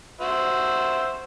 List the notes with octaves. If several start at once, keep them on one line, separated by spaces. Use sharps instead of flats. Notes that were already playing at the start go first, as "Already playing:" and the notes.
F#4 C5 E5